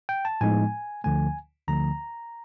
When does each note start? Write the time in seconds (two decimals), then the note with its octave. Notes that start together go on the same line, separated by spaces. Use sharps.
0.09 G5
0.25 A5
0.41 A2 F3 G#3 B3 D#4 G#5
1.04 D2 D3 F3 A3 G#5
1.67 D2 D3 F3 A3 A#5